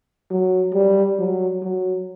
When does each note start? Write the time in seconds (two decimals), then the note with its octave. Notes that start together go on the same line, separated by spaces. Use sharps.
0.31 F#3
0.74 G3
1.19 F#3
1.63 F#3